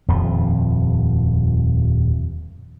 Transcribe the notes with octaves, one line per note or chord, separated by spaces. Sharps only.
D#1 F2 F3